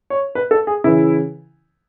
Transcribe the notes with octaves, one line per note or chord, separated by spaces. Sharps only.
C#5
B4
A4
G#4
C#3 E3 E4